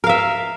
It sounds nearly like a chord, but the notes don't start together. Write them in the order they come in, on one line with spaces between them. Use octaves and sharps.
A#4 F5 E5